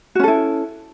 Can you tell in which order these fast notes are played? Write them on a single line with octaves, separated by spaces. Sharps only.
F#4 C#4 A4 E4